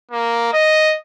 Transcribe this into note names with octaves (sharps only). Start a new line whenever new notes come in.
A#3
D#5